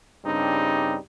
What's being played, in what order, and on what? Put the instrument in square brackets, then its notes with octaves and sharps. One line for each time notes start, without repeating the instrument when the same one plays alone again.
[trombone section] G2 C#3 G3 C4 D4 D#4